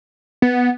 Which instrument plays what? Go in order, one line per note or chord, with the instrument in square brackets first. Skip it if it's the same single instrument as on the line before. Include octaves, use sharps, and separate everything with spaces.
[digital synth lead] B3